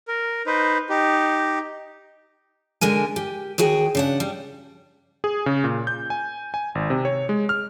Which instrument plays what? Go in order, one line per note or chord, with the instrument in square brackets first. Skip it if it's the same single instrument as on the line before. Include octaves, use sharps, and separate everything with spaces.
[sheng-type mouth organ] A#4
D#4 B4 C5
D#4 G4
[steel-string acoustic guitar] D3 G#3 A#4 G#5
G4
D#2 F#4 G#4 G5
C#3 D4 F#5
G3
[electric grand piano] G#4
C#3
A#2
G6
G#5
G#5
G#1
C3
C#5
G#3
F6